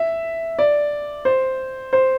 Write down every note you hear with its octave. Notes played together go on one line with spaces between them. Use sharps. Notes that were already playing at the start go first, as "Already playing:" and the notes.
Already playing: E5
D5
C5
C5